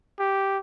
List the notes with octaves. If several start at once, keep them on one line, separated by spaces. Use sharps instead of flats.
G4